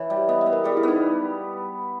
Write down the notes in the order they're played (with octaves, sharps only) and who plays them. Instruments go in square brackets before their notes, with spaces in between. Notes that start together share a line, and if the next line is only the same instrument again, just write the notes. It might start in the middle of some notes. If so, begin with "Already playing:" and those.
Already playing: [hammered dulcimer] E3 [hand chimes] C#5
[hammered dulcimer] G3
[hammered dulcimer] B3 [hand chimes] D#5
[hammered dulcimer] B3 [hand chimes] E5
[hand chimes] A#4
[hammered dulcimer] G3 [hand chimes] G#4
[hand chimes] E4
[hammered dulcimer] B3 [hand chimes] D#4